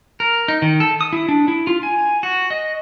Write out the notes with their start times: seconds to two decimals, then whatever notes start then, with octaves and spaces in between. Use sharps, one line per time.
0.20 A#4
0.48 D#4
0.62 D#3
0.80 A4
1.01 D#6
1.13 E4
1.29 D4
1.48 E4
1.67 F4
1.83 G#5
2.23 F#4
2.50 D#5